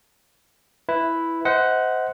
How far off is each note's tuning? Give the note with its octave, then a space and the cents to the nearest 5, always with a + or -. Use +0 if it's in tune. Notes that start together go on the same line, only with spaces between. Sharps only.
E4 +0 B4 +5
C5 -20 D#5 +40 F#5 +0